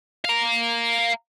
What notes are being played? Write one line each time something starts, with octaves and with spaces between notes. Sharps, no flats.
F5 A#5